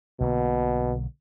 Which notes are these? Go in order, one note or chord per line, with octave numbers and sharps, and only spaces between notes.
B1 B2 D3 A#3